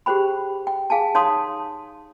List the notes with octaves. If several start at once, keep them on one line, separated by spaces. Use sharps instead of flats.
G4 G#4 C5 G5 B5
G5
G#4 F5 G#5 A5
D#4 C#5 F5 A5 C6 D#6